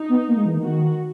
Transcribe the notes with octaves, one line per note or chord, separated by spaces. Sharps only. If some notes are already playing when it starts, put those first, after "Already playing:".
Already playing: D#4
B3
A#3
G#3
E3
D#3
F#4